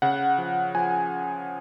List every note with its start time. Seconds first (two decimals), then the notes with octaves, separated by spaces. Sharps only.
0.02 C#3 F#5
0.38 F3
0.75 F3 G#5